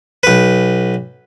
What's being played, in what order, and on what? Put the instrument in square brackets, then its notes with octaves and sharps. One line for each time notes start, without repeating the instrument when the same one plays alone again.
[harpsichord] B1 B4